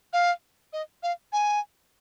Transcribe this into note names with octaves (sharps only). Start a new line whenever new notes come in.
F5
D#5
F5
G#5